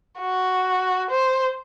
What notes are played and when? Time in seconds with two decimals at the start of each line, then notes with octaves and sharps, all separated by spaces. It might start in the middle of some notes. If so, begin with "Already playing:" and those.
0.19 F#4
1.11 C5